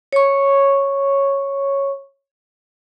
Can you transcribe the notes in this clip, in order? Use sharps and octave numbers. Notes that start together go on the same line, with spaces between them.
C#5 C#6